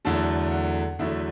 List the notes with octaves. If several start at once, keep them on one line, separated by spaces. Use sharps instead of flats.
E2 D3 F#3 A3 A5
F#5
E2 D3 F#3 A3 E5